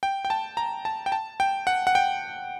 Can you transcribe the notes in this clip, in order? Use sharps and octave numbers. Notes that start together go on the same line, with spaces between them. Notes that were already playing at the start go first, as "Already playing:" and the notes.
G5
G5
A5
A#5
A5
G5
A5
G5
F#5
F#5
G5